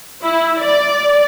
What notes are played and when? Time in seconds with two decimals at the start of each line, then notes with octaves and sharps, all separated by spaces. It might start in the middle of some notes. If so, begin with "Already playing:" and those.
0.23 E4
0.60 D5